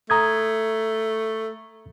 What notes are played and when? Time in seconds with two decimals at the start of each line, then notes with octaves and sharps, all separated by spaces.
0.10 A3 A#5 D#6 G#6